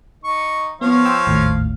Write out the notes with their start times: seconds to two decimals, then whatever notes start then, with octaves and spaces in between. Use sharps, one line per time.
0.24 D#4 C#6
0.81 F3 B3 C#5 F5
1.05 G5 C6 E6
1.27 G#1 D#2 A2